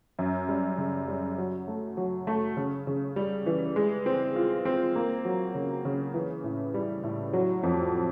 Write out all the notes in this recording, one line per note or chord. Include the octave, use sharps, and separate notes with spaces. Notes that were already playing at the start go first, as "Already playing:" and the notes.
F#2
G3
C#3
G3
F#3
A3
F#3
A3
C#3
C#3
G3
E3
G#3
C4
F4
C4
A#3
F#3
C#3
C#3
E3
A2
G3
A2
F#3
F2